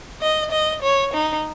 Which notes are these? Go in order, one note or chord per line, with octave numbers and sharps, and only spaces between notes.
D#5
D#5
C#5
D#4